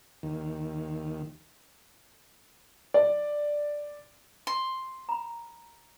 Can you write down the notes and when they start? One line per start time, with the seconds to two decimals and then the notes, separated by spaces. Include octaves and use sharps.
0.23 D#2
2.94 D5
4.47 C6
5.09 A#5 B5